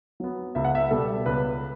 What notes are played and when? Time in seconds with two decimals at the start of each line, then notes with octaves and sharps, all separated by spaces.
0.20 F#3 B3
0.55 C#2 E5
0.64 F#5
0.75 E5
0.91 B2 G3 A4
1.26 C#2 B4